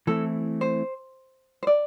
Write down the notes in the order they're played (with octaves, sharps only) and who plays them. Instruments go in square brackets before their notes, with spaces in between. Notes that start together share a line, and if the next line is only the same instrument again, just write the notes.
[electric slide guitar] E3 A3 C4 E4 [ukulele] A4
[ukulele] C5
C5
D5